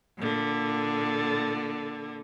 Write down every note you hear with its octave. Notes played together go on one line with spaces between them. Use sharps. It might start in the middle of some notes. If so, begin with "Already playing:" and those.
A#2 D3